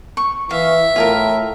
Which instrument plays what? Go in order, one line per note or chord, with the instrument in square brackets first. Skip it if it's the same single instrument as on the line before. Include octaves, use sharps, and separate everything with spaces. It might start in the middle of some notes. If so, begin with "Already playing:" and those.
[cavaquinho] C#6
[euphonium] E3 [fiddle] E5 [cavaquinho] F5
[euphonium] A2 [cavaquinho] F4 G#4 A#4